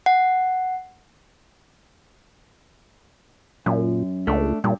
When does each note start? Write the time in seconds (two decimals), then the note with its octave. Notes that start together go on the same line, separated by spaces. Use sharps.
0.06 F#5
3.66 F#2 A#2
4.27 C#2 A3 D4
4.64 G2 A#2